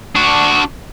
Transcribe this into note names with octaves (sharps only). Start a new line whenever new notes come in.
D4 F#4